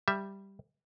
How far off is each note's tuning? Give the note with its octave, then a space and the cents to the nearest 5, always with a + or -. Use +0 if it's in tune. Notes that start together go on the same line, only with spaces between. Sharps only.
G3 +0 E5 +0